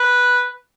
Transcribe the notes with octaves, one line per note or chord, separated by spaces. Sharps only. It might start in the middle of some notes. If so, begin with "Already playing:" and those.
Already playing: B4